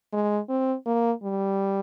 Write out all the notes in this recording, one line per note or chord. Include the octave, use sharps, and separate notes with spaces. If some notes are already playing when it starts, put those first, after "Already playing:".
G#3
C4
A#3
G3